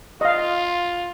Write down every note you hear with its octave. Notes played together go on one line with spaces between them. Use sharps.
F4 D#5 F5